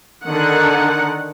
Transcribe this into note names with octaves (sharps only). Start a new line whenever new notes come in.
D3 D#3 F#5